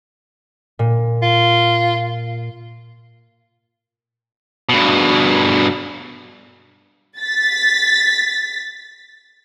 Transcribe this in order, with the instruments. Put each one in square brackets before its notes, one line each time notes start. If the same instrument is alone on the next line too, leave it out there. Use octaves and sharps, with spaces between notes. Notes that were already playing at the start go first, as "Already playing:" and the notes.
[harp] A#2
[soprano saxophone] F4
[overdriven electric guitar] G2 B2
[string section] A6 B6